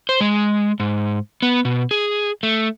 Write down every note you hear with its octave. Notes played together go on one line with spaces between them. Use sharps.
C5
G#3
G#2
B3
B2
G#4
A3